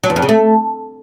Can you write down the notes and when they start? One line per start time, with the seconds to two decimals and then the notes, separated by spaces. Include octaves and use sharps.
0.04 F#3
0.10 E2
0.16 F2
0.22 C#3
0.29 A3